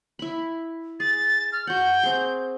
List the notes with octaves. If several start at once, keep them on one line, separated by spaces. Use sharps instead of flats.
E4 B5
G#4 A6
F6
F#4 F#5 G6
C4 G#4